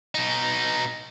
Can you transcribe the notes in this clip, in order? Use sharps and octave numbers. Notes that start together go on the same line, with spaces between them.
B2 D#4